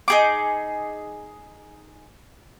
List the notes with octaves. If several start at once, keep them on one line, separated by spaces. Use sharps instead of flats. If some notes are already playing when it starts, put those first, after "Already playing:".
D#4 G#4 D6